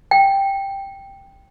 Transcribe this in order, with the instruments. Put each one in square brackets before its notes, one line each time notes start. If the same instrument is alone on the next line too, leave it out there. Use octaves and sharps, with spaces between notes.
[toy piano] G5